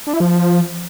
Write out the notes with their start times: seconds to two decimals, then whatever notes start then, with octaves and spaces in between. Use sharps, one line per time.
0.07 D4
0.13 E4
0.20 F3